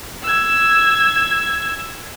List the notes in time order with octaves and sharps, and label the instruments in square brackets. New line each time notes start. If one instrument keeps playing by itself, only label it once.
[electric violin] E6 G#6